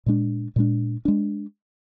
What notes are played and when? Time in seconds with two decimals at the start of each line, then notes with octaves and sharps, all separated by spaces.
0.06 A#2 G#3 D4
0.56 A#2 G#3 D4
1.05 G#3 D4